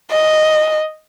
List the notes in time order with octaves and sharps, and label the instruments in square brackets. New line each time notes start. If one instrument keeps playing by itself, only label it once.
[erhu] D#5